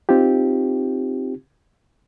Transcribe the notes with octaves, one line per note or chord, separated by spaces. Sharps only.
C4 D#4 F4 G4